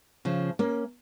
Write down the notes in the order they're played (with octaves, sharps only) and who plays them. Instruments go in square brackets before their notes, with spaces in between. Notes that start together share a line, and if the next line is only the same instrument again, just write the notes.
[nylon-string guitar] C#3 F3
A#3 C#4